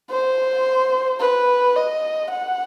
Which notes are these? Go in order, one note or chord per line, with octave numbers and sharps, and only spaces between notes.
C5
B4
D#5
F#5